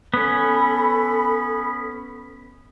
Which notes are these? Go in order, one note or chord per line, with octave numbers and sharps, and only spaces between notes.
B3 C#4 A4 B5